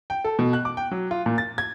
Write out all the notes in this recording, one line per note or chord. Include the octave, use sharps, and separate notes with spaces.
G5
A4
B2
F#6
D6
G5
F#3
F4
A#2
A6
G#6